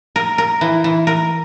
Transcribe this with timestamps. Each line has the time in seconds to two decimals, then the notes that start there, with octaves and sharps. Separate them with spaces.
0.16 A#4
0.38 A#4
0.61 E3
0.84 E3
1.07 A#4